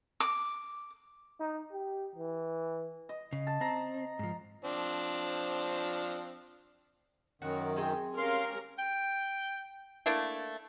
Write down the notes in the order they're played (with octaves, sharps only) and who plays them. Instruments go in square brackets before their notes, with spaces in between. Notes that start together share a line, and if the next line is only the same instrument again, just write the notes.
[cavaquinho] D6
[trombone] D#4
G4
E3
[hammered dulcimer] D#5
[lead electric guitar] C#3
[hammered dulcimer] A5
[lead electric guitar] C4 [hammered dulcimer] A#5
[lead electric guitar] G#2 F3
[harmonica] F3 C4 D4
[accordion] F#2 D#3 [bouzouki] F#4 A#4
[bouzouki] C4 G#4 G5
[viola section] C#4 G4 A#4 [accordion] F5 C6
[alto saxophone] G5
[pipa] A3 A#3 D4 E4